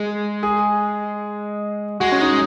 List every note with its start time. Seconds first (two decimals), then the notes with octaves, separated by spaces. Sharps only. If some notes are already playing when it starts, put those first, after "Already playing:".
Already playing: G#3
0.43 G#4
2.00 G#3 F#4
2.12 C#4
2.21 D#4